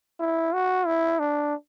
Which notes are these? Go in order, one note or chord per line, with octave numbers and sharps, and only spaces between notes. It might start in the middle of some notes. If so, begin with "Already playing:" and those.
E4
F#4
E4
D4